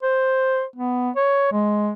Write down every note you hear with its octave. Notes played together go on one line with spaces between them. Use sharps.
C5
B3
C#5
G#3